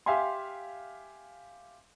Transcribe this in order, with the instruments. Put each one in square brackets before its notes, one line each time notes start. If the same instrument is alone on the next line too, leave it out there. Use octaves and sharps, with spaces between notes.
[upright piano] G4 E5 F5 G#5 C6